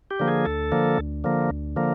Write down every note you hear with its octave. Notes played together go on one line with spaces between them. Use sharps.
G4
D3 F3 A#3
G#4
D2 A4
D3 F3 A#3
D2
D3 F3 A#3
D2
D3 F3 A#3